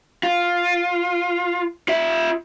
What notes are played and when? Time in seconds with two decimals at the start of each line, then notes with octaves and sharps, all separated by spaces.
0.23 F4
1.88 F4 E5